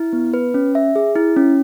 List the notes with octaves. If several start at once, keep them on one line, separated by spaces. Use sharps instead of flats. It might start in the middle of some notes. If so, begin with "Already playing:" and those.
Already playing: E4
B3
B4
C#4
E5
G#4
E4
C#4